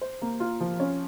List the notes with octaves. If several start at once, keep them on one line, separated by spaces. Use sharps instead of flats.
C5
A#3
F4
F3
C#4